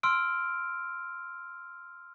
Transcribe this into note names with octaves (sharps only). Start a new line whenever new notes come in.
C6 E6 F6 D7